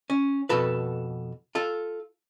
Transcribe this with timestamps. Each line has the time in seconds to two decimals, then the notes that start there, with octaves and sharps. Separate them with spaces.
0.10 C#4
0.49 F2 B2 F#4 A4 B4
1.55 F4 A4